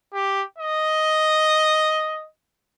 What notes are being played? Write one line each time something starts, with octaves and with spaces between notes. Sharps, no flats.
G4
D#5